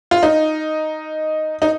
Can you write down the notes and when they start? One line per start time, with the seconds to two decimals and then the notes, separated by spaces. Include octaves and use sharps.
0.11 F4
0.23 D#4
1.62 D#4